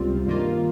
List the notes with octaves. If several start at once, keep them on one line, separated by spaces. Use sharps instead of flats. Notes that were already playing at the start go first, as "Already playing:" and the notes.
Already playing: C#2 C3 G3 C4 F4
G2 D#3 A#3 F4